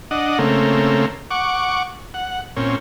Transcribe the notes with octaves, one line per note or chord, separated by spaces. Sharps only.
D4 D#5 F#5
C#3 A3 A#3 C4
F#5 C#6 D6
F#5
A#2 C4 C#4